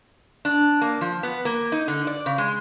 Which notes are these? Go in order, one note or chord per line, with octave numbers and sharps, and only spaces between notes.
D4
A#3
F3
B3
A#3
D#4
D3
D5
C#3
G#3